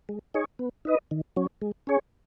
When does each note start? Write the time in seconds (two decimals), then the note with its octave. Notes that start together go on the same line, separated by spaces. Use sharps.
0.09 G#3
0.34 D#4 G#4 C#5
0.59 B3
0.85 D#4 B4 D#5
1.11 D#3
1.36 F#3 C#4
1.62 G#3
1.87 C#4 G#4 C#5